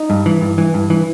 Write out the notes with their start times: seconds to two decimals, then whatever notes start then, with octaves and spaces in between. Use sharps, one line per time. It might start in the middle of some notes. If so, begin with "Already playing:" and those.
Already playing: D#4
0.10 G2
0.26 E3
0.41 G2
0.58 E3
0.74 G2
0.90 E3